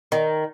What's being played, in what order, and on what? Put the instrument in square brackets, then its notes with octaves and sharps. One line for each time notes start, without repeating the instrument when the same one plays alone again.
[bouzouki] D#3